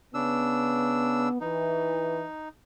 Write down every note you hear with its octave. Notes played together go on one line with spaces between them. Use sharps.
C#3 B3 D4 E6
E3 D#4 B4